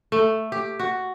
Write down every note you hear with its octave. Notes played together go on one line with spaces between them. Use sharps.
A3
G4
F#4